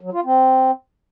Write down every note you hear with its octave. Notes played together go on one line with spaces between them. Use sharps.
F#3
F4
C4